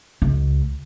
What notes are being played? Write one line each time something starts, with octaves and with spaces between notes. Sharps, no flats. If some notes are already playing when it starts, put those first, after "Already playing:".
C#2